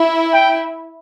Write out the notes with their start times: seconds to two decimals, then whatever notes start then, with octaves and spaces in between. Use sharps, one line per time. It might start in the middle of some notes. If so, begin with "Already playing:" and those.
Already playing: E4
0.34 G5